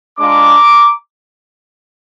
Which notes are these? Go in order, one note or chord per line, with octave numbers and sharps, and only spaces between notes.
G#3 D4 F4 A#5 D6